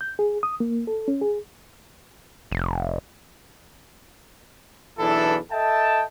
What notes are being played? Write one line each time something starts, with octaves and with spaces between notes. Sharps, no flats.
G6
G#4
D#6
A#3
A4
C#4
G#4
F1
B1 E2 E3 D4 E4 A4
A4 D#5 E5 G5 A5